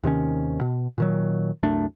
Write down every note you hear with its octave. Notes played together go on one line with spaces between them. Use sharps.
D#2 C3 D#3 C#4
B2
A#2 D#3 F#3
C2 F#2 A3 D4